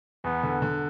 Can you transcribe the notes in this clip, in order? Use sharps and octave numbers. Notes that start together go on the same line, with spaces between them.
E2 B3
D3
D3